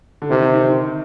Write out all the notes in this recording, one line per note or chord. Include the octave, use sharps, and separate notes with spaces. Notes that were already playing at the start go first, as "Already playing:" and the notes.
D3
C3 D#3
D#3
D#3
D#3